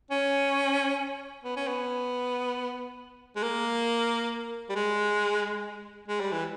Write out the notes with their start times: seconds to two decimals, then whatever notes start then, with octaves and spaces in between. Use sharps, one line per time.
0.11 C#4
1.44 B3
1.56 C#4
1.68 B3
3.36 G#3
3.43 A#3
4.69 G3
4.75 G#3
6.08 G#3
6.20 G3
6.31 E3